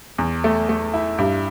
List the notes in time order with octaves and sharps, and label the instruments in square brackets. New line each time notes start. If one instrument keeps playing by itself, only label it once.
[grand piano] E2
A3
A3
E4
G2